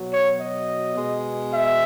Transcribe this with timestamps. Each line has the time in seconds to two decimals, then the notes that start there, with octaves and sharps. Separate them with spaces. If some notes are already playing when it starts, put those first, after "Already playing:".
Already playing: B2 F#3
0.11 C#5
0.39 D#5
0.96 B2 G#3
1.53 E5